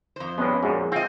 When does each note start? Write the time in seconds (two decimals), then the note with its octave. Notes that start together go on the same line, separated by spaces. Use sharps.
0.16 F2 C5
0.38 G2 G#3 B3 C#4
0.63 A#1 F#2 G#3
0.92 C4 F4 D#5